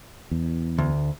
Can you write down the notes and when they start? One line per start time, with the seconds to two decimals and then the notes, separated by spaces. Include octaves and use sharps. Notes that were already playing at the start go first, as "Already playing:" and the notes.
0.31 E2
0.78 D2